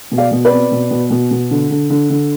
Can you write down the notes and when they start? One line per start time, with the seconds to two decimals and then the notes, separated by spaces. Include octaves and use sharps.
0.12 B2
0.18 D5 F5
0.31 B2
0.45 B4 D5
0.51 C4
0.71 B2
0.91 B2
1.11 B2
1.31 B2
1.51 D3
1.71 D3
1.90 D3
2.10 D3